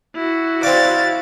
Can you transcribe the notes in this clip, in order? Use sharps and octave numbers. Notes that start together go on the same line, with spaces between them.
E4 F#4
C4 D5 F5 A6